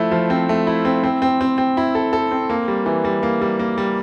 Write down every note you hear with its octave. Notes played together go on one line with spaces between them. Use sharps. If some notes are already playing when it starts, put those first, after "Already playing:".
Already playing: F3 A3 E4
F3
C4
A3
E4
C4
C4
C4
C4
C4
E4
A4
A4
C4
A#3
G3
E3
G3
A#3
G3
A#3
G3